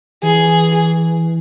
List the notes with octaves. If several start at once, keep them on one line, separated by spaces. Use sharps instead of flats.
E3 G#4